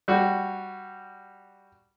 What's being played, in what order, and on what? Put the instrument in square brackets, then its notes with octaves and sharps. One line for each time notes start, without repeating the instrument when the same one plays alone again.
[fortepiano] G3 F#4